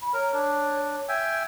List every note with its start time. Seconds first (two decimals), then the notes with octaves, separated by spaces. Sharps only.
0.02 B5
0.13 A#4 C#5
0.34 D4
1.09 E5 G5 G#5